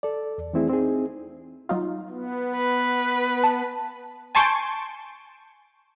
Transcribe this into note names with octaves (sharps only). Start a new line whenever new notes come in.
A4 D5
E2
E3 A3 C4 E4 G#4
C4 D#4 G#4
F#3 D#4 F4
B3
B4
A5
G#5 A5 C6 C#6 G6 D7